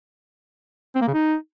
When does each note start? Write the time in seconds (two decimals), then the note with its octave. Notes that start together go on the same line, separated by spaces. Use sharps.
0.95 C4
1.01 A#3
1.07 C#3
1.14 D#4